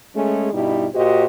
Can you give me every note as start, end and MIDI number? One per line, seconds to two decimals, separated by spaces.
0.16 0.50 56
0.16 0.50 57
0.16 0.50 61
0.16 0.50 68
0.53 0.87 43
0.53 0.87 47
0.53 0.87 55
0.53 0.87 63
0.53 0.87 64
0.95 1.26 46
0.95 1.26 66
0.95 1.26 67
0.95 1.26 72
0.95 1.26 75